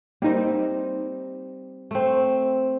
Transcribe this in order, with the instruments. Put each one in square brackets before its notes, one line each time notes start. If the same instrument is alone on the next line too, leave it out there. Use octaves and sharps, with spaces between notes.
[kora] G3 C4 [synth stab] A#3 D#4
[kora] A3 C4